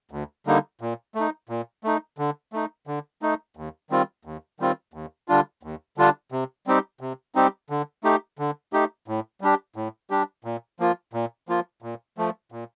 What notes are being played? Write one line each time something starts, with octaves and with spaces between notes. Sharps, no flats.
D2
D3 G3 A#3 D#4
A#2
A3
D#4
A#2
A3 D#4
D3
A3 D#4
D3
A3 D#4
D#2
D#3 G3 C4 F4
D#2
D#3 G3 C4 F4
D#2
D3 G3 D4 F4
D#2
D3 G3 D4 F4
C3
G3 C4 D#4 G4
C3
G3 C4 D#4 G4
D3
A3 D#4 G4
D3
A3 D#4 G4
A2
G3 D4 G4
A2
G3 D4 G4
A#2
F3 A#3 F4
A#2
F3 A#3 F4
A#2
F3 A3
A#2